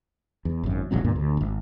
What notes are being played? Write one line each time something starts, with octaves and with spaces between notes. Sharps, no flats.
E2
G#1 F#2
D#1 A#1 F#3 C4
D2 G2 A#2 B3
D2
D#1 G#1